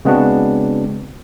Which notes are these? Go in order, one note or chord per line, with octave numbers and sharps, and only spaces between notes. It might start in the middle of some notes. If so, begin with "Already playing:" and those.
C#3 G#3 B3 C4 D4 F#4